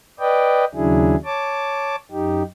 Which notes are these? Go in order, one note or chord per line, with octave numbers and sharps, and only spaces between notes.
B4 D5 D#5 G5
D#2 C#3 F#3 D4 E4 G#4
C#5 A5 D6
F#2 D#4 G4